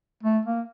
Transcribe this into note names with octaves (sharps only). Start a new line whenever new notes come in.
A3
A#3